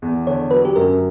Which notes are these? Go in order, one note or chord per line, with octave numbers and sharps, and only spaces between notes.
E2
D3 C#5
F#3 B4
G4
F#2 A#4